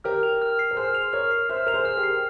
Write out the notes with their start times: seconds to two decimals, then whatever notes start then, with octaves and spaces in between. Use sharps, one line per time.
0.04 G4 A#4 F6
0.23 F7
0.42 F6
0.59 C7
0.71 A#4
0.77 G#4 C5 F6
0.95 F7
1.13 A#4 C#5 F6
1.31 C7
1.49 C5 E5 F6
1.67 A#4 F7
1.74 G#4 C5
1.85 G#4 F6
1.97 G4 A#4
2.03 C7